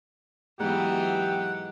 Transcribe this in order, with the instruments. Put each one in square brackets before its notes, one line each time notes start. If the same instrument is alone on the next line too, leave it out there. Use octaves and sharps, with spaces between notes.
[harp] G#2 [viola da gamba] E3 F#3 B3 [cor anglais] G4 [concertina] F#5